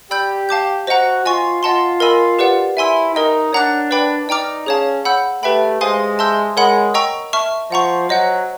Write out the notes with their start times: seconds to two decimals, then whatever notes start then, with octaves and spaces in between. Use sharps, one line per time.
0.11 G4 D5 G5 B5 E6 G6
0.49 F5 A5 D6 G6
0.87 F#4 C5 D#5 F#5 A#5
1.25 F4 D#5 G#5 C#6
1.63 F4 D#5 F#5 A5 C6
2.00 A#4 D#5 G#5 B5 E6
2.39 G4 B4 D5 F#5
2.77 E4 E5 G#5 C6 E6
3.15 D#4 A#4 D#5 G5
3.53 D4 C#5 F#5 A#5 D6 F#6
3.91 B4 D5 G5 B5 D6
4.28 D#4 D5 G5 A#5 D6 F6
4.66 C#4 G#4 C#5 F5 A5
5.05 F#5 B5 E6 G6
5.43 A3 G4 B4 E5 G5 B5
5.81 G#3 C5 F5 G#5 C6 D#6
6.19 E5 A5 C6 E6 G6
6.57 G#3 A#4 C#5 F#5 B5
6.94 D#5 G5 A#5 C#6 E6
7.33 E5 A5 C#6 F6
7.71 F3 D#5 F#5 A#5 C#6
8.09 F#3 C5 D#5 F#5